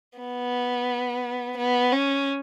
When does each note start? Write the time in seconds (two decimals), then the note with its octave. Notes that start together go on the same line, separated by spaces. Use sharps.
0.19 B3
1.57 B3
1.93 C#4